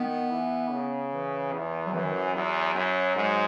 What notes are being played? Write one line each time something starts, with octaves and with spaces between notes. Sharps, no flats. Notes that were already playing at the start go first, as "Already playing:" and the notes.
Already playing: D#3 B3
E3
C#3
E3
E2
F#3
F#2 E3
D#3
E3
E2 F#3
F#2
G#2